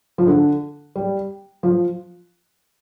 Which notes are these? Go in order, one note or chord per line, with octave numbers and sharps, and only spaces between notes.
F3
D3
G3
F3